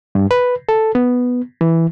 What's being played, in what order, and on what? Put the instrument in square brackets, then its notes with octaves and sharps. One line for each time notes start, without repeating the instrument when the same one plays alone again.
[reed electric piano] G2
B4
A4
B3
E3